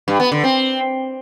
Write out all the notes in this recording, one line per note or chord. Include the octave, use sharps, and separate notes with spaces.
G2
B3
D3
C4